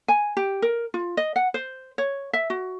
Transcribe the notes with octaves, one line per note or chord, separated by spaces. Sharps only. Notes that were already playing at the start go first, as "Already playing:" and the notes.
G#5
G4
A#4
F4
D#5
F#5
C5
C#5
E5
F#4